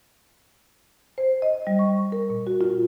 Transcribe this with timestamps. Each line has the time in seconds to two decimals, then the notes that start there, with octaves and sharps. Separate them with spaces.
1.18 C5
1.42 D#5
1.67 G3
1.79 C#6
2.12 A#4
2.30 A#2
2.47 F#4
2.61 F4